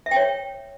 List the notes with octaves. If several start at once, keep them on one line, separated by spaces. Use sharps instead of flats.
E5
G5
C#5